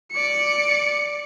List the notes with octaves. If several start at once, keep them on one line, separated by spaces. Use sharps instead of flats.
D5 C#7